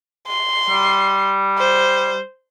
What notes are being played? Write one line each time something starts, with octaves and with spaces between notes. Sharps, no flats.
C6
G3
C5